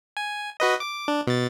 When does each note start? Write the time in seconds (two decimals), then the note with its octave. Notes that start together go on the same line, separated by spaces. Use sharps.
0.17 G#5
0.60 F#4 B4 D#5
0.80 D6
1.08 D4
1.27 B2 A6